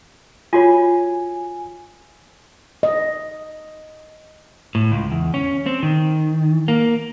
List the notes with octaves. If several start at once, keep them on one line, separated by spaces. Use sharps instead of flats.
F4 F#4 C#5 G#5
D#5
A2
C#2
E2
C#4
C4
D#3
A#3